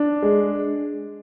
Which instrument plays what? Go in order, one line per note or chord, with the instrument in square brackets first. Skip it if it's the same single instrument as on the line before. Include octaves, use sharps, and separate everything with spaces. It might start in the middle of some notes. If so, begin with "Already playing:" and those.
Already playing: [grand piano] D4
G#3